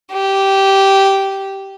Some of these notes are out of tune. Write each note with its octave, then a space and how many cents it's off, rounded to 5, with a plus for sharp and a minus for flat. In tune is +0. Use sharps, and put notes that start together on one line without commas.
G4 -10